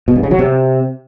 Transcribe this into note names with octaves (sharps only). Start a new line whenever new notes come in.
B2
G2
C#3
F#3
C3